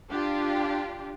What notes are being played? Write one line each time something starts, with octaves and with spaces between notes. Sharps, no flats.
D4 F4 G4